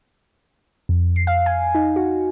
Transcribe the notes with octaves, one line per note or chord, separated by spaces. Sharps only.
F2
C7
F5
G#5
D#4
F#4